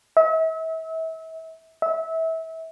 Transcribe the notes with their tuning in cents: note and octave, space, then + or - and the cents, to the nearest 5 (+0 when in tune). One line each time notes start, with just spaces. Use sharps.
E5 -35
E5 -25